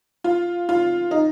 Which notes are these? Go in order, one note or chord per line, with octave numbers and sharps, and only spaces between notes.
F4
F4
D#4